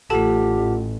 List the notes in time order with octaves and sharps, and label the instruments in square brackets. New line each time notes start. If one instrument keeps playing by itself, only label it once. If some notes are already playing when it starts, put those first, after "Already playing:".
[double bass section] A1 [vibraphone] A3 F4 F#5 [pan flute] G4 [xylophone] A4 A5